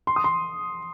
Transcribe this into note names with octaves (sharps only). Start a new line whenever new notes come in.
C6
D#6
C6